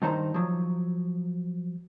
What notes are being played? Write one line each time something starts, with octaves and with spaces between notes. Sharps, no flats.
G2 D#3 D#4 C5 A#5
F3 F#3